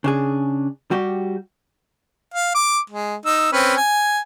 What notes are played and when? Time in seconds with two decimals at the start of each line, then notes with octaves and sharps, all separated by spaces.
0.04 C#3 D4 G#4
0.91 G3 F#4 G4
2.34 F5
2.55 D6
2.90 G#3
3.26 D#4 E6
3.52 C4 C#4 B4
3.76 G#5